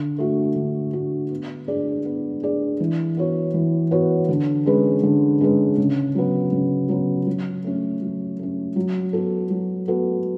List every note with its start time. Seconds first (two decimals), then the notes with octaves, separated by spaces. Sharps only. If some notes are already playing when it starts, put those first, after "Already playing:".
Already playing: D3
0.18 A3 D4 F#4
0.56 D3
0.93 A3 D4 F#4
1.31 B3
1.68 D4 G#4 D5
2.05 B3
2.42 D4 G#4 D5
2.80 E3
3.17 B3 F#4 C#5
3.54 E3
3.91 B3 F#4 C#5
4.29 D3
4.66 G#3 C#4 G#4 B4
5.03 D3
5.41 G#3 C#4 G#4 B4
5.78 C#3
6.15 F#3 B3
6.52 C#3
6.89 F#3 B3
7.27 F#3
7.64 A3 C#4
8.02 F#3
8.39 A3 C#4
8.76 F#3
9.13 B3 F#4 A4
9.51 F#3
9.88 B3 F#4 A4